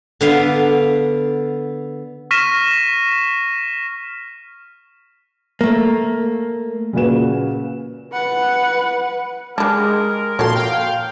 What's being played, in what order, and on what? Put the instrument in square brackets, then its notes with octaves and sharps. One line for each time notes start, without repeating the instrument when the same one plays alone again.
[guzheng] D3 B3 F5
[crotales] C#6 F6 A#6 B6 D#7 E7
[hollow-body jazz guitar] A3 A#3
[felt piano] A#2 C#3 F#4 B4 E7
[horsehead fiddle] B4 F#5
[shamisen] G3 D4 [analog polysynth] G#3 [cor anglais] A#4
[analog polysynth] A#2 F3 C6 [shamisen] F#4 A4 C#5
[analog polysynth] F5 G5